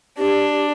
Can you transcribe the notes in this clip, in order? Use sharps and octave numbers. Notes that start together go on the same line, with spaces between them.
D4 G4